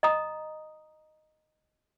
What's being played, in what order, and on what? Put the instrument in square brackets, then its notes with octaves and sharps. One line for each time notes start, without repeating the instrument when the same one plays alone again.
[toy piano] D#5 A#5 D#6